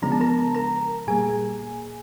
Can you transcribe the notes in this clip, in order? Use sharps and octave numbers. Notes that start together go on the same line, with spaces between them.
C#3 F3 G#3 B3 D4 A#5
A5
A#4 A#5
A#4 A#5
A#2 G3 A#3 G#4 G#5